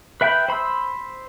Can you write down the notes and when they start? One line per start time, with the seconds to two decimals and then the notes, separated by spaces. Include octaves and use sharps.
0.21 B4 E5 G5 B5 G6
0.49 C5 B5 C6 E6